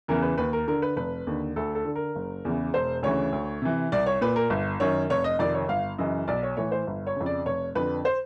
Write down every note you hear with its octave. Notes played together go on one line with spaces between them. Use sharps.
E2 C#3 E3 A#4
B4
D#2 B4
A#4
D3 A#4
B4
F1 B4
D#2 D3
D2 A4
A4
D3
A#4
F#1
E2 C#3 E3
E1 C5
D2 C#3 E3 C#5
D2
C3 E3
C2 D5
C#5
A#2 B4
A#4
G1
F#2 D#3 C#5
F1 C#5
D#5
F2 C3 D#3 D5
C#5
G1 F5
F#2 C#3 E3 D#5
B1 D5
C#5
A2 E3 C#5
C5
G1
C#5
F2 C#3
D5
F1 C#5
F2 D3 B4
C5